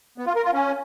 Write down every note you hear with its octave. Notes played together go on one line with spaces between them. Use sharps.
B3
F4
A#4
F4
C#4